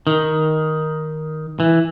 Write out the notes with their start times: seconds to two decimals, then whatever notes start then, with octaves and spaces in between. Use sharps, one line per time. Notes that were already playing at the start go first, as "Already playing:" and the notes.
0.07 D#3
1.60 E3